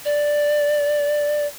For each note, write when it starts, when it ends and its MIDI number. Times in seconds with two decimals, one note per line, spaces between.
0.05 1.47 74